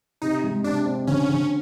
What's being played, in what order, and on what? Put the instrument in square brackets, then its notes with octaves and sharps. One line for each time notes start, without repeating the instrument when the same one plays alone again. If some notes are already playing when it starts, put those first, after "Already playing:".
[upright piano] C3 [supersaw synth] D#4
[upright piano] G#3
[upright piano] C3 [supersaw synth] D4
[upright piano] C4
[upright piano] D3 [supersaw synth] C#4
[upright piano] D3